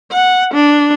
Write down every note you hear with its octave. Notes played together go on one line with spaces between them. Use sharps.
F#5
D4